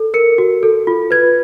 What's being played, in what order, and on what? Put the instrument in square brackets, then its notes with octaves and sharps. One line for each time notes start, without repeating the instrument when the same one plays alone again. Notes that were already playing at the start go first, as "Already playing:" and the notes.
Already playing: [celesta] A4
A#4 C#7
F#4
A4
F4
B4 G#6